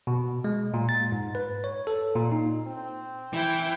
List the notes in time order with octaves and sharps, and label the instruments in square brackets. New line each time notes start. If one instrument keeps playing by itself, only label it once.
[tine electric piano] B2
G#3
A#2
A6
G#2
B4
C#5
A4
A#2
D#4
[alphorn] C4
[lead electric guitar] E3 [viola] E4 G5